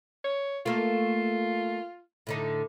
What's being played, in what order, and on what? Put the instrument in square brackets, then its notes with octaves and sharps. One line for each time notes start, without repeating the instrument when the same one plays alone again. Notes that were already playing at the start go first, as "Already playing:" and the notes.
[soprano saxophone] C#5
[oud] A3 A#3 [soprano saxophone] F4
[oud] A2 D3 D#4